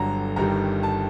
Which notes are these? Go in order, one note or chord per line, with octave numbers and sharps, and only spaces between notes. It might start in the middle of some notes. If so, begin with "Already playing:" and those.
Already playing: G1 G2 D3 F#3 A#5
G1 G2 D#3 G3 A#5
A5